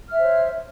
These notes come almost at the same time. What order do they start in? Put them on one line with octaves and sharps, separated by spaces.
F6 E5 C5 C#5